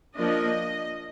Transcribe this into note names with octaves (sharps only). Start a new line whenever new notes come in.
F3 A#3 D4 D#5